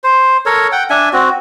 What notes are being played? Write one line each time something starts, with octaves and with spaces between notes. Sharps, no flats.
C5
A4 A#4 C#5
F#5 G5
D4 E5 G#5
C4 F#4